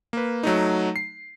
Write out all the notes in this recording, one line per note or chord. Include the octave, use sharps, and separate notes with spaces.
A#3 B4
F#3 A3 D#4
C7